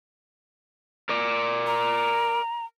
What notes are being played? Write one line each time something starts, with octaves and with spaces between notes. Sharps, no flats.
A#4 D5
A#5